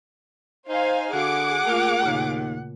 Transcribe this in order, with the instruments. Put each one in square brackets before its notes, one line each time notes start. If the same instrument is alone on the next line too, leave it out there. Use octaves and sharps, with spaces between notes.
[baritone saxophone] D#4 [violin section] C5 F5 G#5
[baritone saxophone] D3 [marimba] F#4 [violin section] G#4 D6 [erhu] F#5
[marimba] A3 F4 [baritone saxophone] A#3
[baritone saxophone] D#2 [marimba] A#2 C#3 A#3